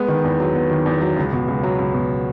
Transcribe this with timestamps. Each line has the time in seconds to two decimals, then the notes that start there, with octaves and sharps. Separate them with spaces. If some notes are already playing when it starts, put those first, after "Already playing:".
Already playing: G#3 B3
0.08 D#3
0.24 E2
0.40 F#3
0.55 B3
0.71 D#3
0.86 E2
1.01 F#3
1.16 C#2
1.33 B2
1.48 C#2
1.63 F#3
1.78 C#2
1.94 B2